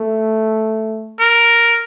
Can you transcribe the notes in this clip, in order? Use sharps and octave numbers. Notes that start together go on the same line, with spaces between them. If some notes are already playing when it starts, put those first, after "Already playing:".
Already playing: A3
A#4